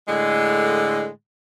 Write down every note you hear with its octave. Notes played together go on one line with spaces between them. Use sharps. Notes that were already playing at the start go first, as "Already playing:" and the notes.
A2 D3 G#3